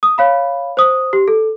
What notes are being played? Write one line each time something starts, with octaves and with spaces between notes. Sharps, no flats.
D#6
C#5 F5 B5
C5 D#6
G4
A4